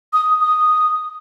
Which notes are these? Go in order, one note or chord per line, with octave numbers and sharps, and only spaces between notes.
D#6
D#6